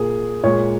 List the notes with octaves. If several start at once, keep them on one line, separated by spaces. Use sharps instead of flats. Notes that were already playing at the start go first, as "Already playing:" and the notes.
Already playing: A#2 A#3 G#4
A#2 G#3 C#5